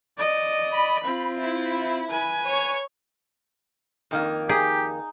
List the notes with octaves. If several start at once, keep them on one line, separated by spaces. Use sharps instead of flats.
D5 D#5
B5
C4 F4
E4
B4 G#5
C#5 C#6
F2 D#3 A#3
D#4 G4 G#4